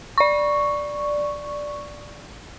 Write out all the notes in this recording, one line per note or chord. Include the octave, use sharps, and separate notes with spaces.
D5 C#6